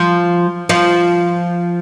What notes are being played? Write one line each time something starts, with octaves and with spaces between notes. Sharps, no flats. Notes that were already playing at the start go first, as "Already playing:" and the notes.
Already playing: F3 F4
F3 F4